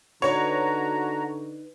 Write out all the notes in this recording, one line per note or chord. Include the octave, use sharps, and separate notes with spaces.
D3 D#4 F#4 B4 C#5 D5 A#5